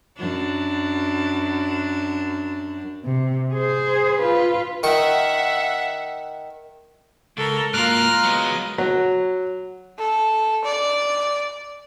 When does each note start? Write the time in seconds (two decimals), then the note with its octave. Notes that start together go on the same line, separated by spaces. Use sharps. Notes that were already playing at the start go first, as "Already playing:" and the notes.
0.17 F#2 D4
3.05 C3
3.54 G#4 C5
4.18 F4 B4
4.83 D#3 E5 F#5 C#6
7.37 C#2 A4 A#4
7.73 G#2 A#3 F4 A#4 A#5 F6 F#6
8.24 F#3 G#3 B3 D#5
8.78 F#3
9.99 A4
10.65 D5